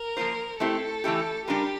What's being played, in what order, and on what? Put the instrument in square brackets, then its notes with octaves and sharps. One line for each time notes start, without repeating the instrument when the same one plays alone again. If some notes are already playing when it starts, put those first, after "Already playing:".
Already playing: [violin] A#4
[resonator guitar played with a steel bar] F3 A#3 F4 C5
[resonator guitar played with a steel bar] A3 C4 E4 G4 C5 [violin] A4
[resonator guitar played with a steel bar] E3 A3 E4 G4
[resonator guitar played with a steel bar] G3 D4 F4 A#4 [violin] G4